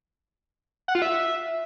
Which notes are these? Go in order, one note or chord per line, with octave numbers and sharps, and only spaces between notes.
F#5
F4
E5